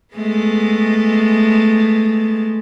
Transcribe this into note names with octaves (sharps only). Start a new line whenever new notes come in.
G#3 A3 B3